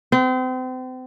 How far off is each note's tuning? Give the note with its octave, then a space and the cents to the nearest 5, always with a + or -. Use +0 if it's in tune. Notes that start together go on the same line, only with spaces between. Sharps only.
C4 -35